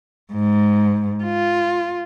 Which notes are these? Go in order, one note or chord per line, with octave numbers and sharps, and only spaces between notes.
G#2
F4